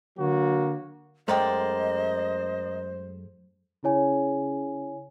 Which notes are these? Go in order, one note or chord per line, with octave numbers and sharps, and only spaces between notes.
D3 F#3 A#3 F#4
F#2 G#3 A3 A#4 C5 D5 D#5 G5
C#3 E4 C#5 G#5